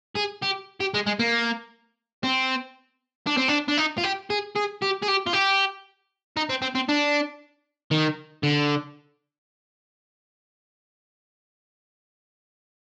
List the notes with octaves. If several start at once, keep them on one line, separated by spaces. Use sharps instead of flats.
G#4
G4
G4
G#3
G#3
A#3
C4
D4
C4
D4
D4
D#4
F4
G4
G#4
G#4
G4
G#4
G4
F4
G4
D#4
C4
C4
C4
D4
D#3
D3